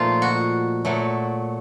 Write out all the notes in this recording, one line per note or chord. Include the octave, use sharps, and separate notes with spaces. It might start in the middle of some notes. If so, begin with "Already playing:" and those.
Already playing: A#2 F3 A3 D#4 F4
F#4
A#2 F#3 A3